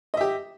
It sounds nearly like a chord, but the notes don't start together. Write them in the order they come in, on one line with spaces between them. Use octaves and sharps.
D#5 E5 G4